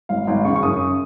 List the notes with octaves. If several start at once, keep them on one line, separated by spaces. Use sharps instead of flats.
G#1 F5
G#1 F5
C#3 C#6
C#6
F#2 D#6